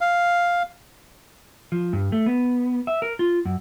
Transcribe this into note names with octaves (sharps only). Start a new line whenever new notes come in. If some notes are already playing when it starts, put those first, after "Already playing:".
F5
F3
G2
A3
B3
E5
A#4
F4
F#2